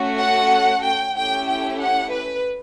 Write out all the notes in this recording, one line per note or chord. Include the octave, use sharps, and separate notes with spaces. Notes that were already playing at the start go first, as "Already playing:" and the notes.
Already playing: A3 C#4 F#4 A4
F#5
G5
A3 C#4 E4 G4 G5
G5
F#5
B4